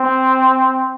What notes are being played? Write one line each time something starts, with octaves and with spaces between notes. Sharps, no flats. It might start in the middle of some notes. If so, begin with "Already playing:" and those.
Already playing: C4